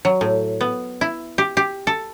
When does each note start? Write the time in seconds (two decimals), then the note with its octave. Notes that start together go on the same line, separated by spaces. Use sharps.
0.05 F#3
0.21 A2
0.61 B3
1.01 E4
1.38 G4
1.57 G4
1.87 A4